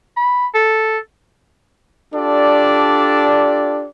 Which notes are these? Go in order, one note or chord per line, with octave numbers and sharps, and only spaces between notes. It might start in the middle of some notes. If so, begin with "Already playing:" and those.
B5
A4
D4 F4 G4 A4 D5